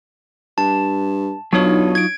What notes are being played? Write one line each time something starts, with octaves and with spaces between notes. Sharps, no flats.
G2 A5
B1 F#3 D4 D#4 F4 C#5
G#6 D7